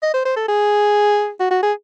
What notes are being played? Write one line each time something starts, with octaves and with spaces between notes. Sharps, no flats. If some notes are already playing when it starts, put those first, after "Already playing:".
D#5
C5
C5
A4
G#4
F#4
F#4
G#4